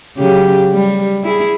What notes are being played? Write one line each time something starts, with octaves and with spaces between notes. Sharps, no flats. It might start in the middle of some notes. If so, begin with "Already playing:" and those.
C#3 F#3 G4
G3
E4 G#4